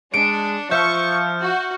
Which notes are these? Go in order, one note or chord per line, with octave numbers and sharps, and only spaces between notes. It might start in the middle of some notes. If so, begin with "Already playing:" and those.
G#3 D4 C#7 D7
F3 E5 C#6 F6 G6
F#4